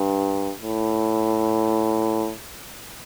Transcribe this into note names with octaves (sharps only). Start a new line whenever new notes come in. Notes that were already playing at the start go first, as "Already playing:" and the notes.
Already playing: G2
A2